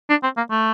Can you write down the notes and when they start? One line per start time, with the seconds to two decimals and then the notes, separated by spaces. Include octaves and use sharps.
0.10 D4
0.23 C4
0.37 A#3
0.51 A3